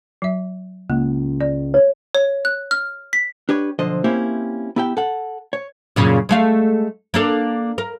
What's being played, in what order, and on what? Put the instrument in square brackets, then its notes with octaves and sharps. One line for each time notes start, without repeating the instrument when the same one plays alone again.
[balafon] F#3 E5
[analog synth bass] C#2 [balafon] A#3
[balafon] D5
[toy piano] C#5
[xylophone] C#5
F#6
F6
B6
[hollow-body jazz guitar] D4 G4 B4 C#5
B1 D3 F3 C5 D#5
A#3 C4 C#4 E4 G4 E5
B3 E4 G4 E5 G5
A4 F#5
C#5
[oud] F#2 A#2 C#3
G#3 A3 F5
A#3 D4 A4
A#4